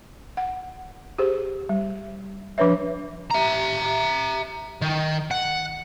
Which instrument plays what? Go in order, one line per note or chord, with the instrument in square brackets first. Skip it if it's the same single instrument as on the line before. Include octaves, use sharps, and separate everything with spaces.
[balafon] F#5
G4 G#4 C5
G3
F3 D4 B4 C#5 E5
[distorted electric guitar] E5 A#5
D#3
F#5